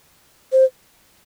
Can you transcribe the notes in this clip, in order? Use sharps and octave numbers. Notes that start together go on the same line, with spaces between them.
C5